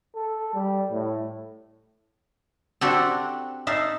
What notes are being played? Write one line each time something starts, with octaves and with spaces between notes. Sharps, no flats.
A4
G3
A2
C4 D4 F#4 G4 A4
D#4 E5 F5 A5